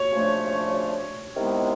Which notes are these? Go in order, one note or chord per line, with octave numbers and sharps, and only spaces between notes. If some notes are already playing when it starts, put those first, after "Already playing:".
Already playing: C#5
C#3 F3 A3 D4
C3 D#3 G#3 B3 E4